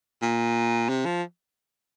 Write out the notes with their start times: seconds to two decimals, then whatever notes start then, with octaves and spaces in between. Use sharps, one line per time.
0.22 A#2
0.89 C3
1.06 F3